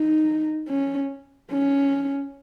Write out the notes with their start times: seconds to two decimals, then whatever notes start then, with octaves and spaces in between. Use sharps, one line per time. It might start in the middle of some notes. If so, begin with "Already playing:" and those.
Already playing: D#4
0.69 C#4
1.51 C#4